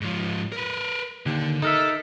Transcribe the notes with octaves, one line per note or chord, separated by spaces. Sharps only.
G#2 F3
A#4 B4
D#2 D3
D#4 A4 A#4 E5